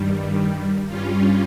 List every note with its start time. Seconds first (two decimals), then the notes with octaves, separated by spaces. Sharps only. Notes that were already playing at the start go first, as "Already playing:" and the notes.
Already playing: G2 D#3 G3
0.88 G2 G3 C#4 F4